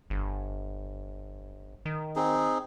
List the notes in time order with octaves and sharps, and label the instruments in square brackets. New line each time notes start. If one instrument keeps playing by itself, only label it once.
[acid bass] G1
D#3
[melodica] C4 D#4 G#4